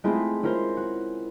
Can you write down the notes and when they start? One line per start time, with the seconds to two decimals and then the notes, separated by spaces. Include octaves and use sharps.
0.04 G#3 A3 C4 E4 F4 G#4
0.43 C#4 E4 F4 A#4 C5
0.77 F#4